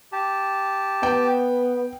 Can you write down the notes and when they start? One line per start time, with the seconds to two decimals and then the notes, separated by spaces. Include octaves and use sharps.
0.12 G4 A5
1.03 B3 G5